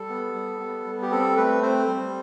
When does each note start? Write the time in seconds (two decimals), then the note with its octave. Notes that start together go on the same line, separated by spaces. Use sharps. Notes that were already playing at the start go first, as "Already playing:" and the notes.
Already playing: G3 A4
0.09 B3
0.34 G3
0.60 B3
0.86 G3
1.02 G4
1.11 C4 A4
1.37 A3 B4
1.62 C4 C5
1.88 G3